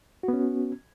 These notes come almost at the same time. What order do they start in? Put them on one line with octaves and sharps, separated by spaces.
F#4 B3 C#4